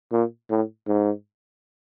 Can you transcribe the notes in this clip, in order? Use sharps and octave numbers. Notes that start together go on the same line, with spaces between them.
A#2
A2
G#2